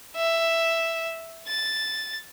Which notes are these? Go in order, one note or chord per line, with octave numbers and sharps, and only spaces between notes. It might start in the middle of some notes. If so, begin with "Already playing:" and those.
E5
A6